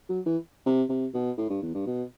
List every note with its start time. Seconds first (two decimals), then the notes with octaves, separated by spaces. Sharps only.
0.09 F#3
0.26 E3
0.66 C3
0.89 C3
1.14 B2
1.38 A2
1.50 G2
1.62 E2
1.74 G2
1.86 B2